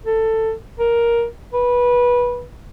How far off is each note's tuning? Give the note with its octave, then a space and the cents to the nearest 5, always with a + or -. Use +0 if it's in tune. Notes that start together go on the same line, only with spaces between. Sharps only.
A4 +15
A#4 +10
B4 -20